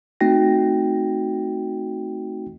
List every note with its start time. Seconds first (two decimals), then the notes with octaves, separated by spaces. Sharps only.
0.21 A3 C4 D#4 F#4 G5 A#6